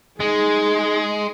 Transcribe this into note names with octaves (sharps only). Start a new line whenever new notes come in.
G#3 D#4 G#4